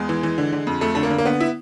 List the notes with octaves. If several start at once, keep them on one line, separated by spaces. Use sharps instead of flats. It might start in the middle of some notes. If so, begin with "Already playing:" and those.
Already playing: E2 G#3
E3
E3
D3
D3
F2
F2 A3
D3 A3
A#3
D3
A#3
D3 B3
E4